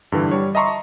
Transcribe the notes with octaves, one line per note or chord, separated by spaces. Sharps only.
G2 D3 E3
G3 C#5
D#5 E5 A5 A#5 C6 C#6